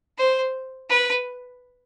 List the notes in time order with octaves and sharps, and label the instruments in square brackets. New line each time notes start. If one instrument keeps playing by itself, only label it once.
[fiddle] C5
B4